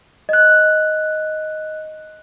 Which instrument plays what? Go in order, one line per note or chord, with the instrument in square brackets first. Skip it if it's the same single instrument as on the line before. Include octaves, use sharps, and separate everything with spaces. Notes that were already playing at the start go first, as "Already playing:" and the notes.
[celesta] D#5 F#6